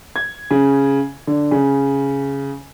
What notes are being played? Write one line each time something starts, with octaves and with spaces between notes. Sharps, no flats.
G#6
C#3
D3
C#3